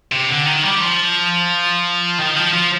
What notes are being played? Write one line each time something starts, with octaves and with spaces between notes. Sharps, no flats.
C3
D3
D#3
G3
F3
D#3
F3
F3